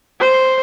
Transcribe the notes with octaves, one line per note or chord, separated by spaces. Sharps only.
C5